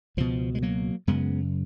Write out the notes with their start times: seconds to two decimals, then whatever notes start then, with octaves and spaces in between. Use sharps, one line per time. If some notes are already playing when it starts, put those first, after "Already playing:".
0.17 C#2 B2 F3
0.55 G#3
0.62 F#3 A#3
1.07 F#2 C#3 G#3 B3